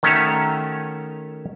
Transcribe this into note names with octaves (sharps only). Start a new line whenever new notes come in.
D#3 A3 C#4 F#4 C#5 E5